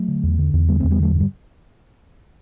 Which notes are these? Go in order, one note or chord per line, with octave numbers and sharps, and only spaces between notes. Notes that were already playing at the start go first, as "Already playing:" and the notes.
Already playing: F#3 A3
D3
E2
D3
E2
D3 G3 B3
A3 C4
E2
G3 B3
D3 F#3 A3
G2
G3